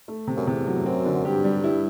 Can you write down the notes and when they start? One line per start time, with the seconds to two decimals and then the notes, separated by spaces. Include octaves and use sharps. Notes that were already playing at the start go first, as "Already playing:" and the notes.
0.08 A3
0.27 C3
0.36 F#2
0.47 E2 C3
0.66 F#3
0.86 F#2 C4
1.06 D3
1.25 G2 G4
1.44 G3
1.64 E4